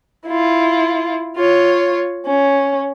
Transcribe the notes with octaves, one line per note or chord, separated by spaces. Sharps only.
E4 F4
F4 C#5
C#4